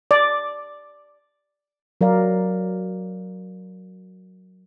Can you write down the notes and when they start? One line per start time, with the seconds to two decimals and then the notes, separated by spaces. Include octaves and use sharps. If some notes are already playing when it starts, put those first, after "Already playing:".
0.11 D5
2.01 F#3 A#4 D5 F5